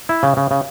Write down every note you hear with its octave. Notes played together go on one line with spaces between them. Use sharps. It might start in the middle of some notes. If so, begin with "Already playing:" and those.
E4
C#3
C#3
C#3